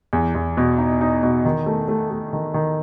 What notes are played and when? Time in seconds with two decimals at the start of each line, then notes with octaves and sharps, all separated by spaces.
0.13 E2
0.35 E2
0.57 B2
0.78 D#4
1.01 D#4
1.23 B2
1.45 D#3
1.66 A3
1.88 A3
2.11 A3
2.33 D#3
2.54 D#3